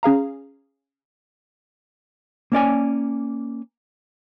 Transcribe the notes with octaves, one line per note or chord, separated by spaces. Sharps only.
C#4 G#4 F5 A#5
A#3 C#4 D5 G#5